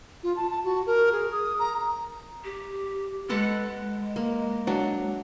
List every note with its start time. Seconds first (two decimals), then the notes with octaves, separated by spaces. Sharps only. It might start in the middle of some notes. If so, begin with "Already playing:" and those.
0.23 F4
0.36 A5
0.50 A5
0.64 F#4
0.86 A#4
1.12 G#4
1.32 D#6
1.59 A#5
2.44 G4
3.29 G#3 A4 B4 F#5
4.16 A#3
4.67 F#3 D4